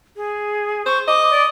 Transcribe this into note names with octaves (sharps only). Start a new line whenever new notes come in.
G#4
C5 C#6
D#5 D6
D5